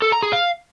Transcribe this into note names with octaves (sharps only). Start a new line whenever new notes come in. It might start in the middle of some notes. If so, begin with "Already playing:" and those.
A4
A#5
G#4
F5